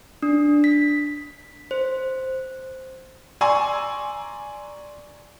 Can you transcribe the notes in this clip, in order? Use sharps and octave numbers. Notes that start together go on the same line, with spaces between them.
D4
B6
C5
D5 G#5 A#5 C6 C#6 E6